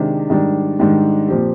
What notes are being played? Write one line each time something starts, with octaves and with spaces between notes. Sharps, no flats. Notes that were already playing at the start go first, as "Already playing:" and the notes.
Already playing: C3 D#3 G#3 D4 G4
G#2 D#3 G3 D4
G#2 D#3 G3 D4
A#2 F3 C4 G4